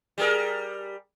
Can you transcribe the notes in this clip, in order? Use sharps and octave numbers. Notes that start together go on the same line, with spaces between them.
G3 G#4 A#4